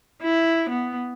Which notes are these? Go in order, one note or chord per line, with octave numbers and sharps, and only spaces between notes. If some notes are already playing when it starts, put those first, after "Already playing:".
E4
B3